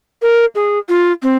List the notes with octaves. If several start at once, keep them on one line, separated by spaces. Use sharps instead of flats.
A#4
G#4
F4
C4